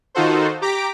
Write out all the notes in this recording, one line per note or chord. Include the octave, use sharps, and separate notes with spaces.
D#3 D#4 F4 F#4 A4 C5
G4 A#5 D6 B6 D7